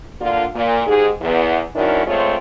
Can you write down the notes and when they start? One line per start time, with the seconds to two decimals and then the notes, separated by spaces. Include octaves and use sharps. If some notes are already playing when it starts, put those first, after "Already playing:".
0.20 D3 A#3 F4
0.55 A#2
0.86 G#2 G4 G#4
1.22 E2
1.75 D#3 F#3 C#4 D4 E4 A#4
2.06 G#3 A3 C4 F4 C#5